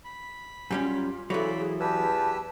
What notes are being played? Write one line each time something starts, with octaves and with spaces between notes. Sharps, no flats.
B5
F#2 G3 C#4 F4
C#3 E3 F#3 A4 C5 D5 B5
G#4
E2 G4 B4 A5 E6